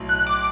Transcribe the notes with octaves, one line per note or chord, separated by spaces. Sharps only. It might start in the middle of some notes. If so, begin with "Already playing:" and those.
Already playing: B1 A2 F#3
F#6
D6